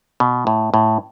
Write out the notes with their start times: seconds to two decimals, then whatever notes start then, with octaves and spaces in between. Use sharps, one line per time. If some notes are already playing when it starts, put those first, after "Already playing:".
0.20 B2
0.47 A2
0.74 A2